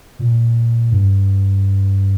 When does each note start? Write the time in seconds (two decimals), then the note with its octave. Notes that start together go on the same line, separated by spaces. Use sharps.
0.19 A#2
0.91 G2